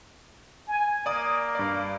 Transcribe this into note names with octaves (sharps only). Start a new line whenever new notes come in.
G#5
A#3 D5 D#6
G2 D5